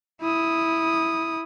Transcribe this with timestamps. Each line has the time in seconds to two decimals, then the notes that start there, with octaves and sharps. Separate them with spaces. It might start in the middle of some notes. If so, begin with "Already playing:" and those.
0.22 E4 D#6